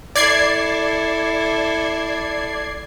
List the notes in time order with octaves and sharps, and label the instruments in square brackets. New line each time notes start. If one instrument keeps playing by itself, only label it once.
[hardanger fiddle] E4 A4 [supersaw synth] D5 G#6 C7